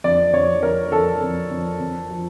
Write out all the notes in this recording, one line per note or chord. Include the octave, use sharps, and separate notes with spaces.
F2 D5
F2 C#5
F2 A#4
F2 A4
F2
F2
F2
F3